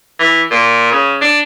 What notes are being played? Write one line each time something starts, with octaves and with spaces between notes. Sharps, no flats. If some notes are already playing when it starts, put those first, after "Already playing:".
E3
A#2
C#3
D4